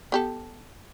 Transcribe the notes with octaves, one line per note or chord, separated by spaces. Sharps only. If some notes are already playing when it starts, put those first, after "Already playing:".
B3 G4 A4